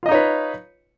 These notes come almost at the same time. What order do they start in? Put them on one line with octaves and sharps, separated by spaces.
F4 D#5 D#4 C#5 B4